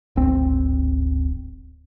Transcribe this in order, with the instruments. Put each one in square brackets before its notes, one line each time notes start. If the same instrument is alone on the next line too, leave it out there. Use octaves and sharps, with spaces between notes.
[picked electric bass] D1 G#1 C4